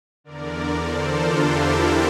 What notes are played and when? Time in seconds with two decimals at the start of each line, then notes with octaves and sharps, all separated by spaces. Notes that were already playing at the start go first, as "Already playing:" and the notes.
0.24 E2 D3 A#4 D5
0.81 A4 C5
1.10 D4 F4
1.39 E4 G4
1.67 G4 A#4